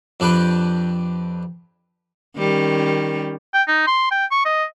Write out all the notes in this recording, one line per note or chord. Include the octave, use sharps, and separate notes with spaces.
F2 D4 G4 B4 G5
D#3 G3 C#4
G5
D#4
C6
G5
C#6
D#5